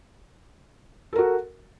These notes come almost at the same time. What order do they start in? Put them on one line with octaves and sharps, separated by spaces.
A4 A#4 F#4